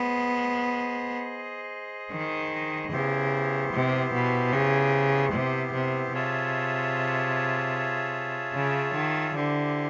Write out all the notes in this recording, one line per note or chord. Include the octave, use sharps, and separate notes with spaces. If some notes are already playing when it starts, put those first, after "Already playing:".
Already playing: B3 G#4 C5 D#5
D#3
C#3 B3 E4 G4 C5
C3
B2
C#3
C3
C3
C3 F4 G#4 C#5 E5 A5
C#3
D#3
D3 E4 G4 C5